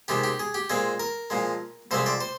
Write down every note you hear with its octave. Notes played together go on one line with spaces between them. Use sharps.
C3 D#3 G#3 G4
G4
G#4
G4
A#2 G#3 C4 G#4
A#4
A#2 F3 G#3
C2 C3 F3 G#3 C4 C5
D5
C5